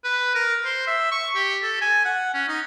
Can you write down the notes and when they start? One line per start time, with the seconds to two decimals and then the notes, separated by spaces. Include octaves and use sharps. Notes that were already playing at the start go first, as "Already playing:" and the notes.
0.04 B4
0.35 A#4
0.65 C5
0.87 E5
1.11 C#6
1.35 G4
1.62 A4
1.81 G#5
2.05 F#5
2.34 C#4
2.48 D#4